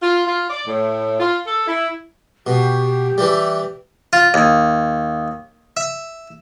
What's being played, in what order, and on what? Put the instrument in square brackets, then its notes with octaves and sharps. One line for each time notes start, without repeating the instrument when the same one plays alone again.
[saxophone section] F4
F4
D5
A2
F4
A4
E4
[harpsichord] B2 [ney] G4
[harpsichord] E3 G3
F4
D#2
E5